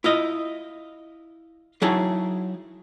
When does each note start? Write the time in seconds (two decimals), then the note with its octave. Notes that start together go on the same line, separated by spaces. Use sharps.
0.04 E4 F4 D#5
1.82 F#3 D#4 E4 G#4 A5